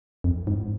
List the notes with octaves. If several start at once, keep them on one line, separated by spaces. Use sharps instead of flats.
F2
G#2